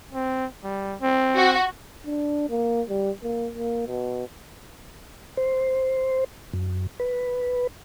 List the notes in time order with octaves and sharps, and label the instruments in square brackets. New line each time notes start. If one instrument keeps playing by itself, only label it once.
[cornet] C4
G3
C4
[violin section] F#4
[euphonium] D4
A#3
G3
A#3
A#3
B2
[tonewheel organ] C5
F#2
B4